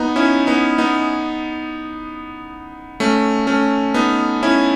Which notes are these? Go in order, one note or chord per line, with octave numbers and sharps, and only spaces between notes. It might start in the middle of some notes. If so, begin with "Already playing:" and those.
Already playing: B3 D#4
C#4 E4
B3 D#4
B3 D#4
A3 C#4
A3 C#4
B3 D#4
C#4 E4